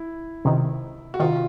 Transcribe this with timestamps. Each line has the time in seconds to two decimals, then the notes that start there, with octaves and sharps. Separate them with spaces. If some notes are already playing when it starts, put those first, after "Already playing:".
Already playing: E4
0.45 C#2 C3 D#3
1.14 F#4
1.20 C3 D#3 F4